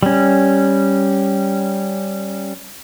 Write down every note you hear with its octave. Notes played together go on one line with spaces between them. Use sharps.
G3 C#4